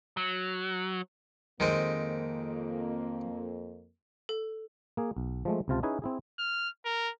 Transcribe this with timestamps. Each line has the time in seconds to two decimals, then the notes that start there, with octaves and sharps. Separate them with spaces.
0.17 F#3
1.60 F2 D#3 G#3 A#3 C4
4.29 A4
4.97 A#3 G#4
5.16 B1
5.45 F3 G#3 A3
5.68 C#2 C3 F4 A5
5.83 C#4 D#4 E4 G#4 B4 G#5
6.02 C4 E4 G#4
6.39 F6
6.85 A#4